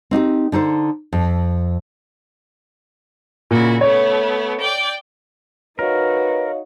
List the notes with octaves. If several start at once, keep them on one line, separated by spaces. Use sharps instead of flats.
C4 D#4 F#4 G4
D3 D#4 A4 C5
F2
A#2 C#3 E4 F#4
A3 B3 C#5
D5 G5
D#4 F#4 A#4 B4 C#5 D#5 F5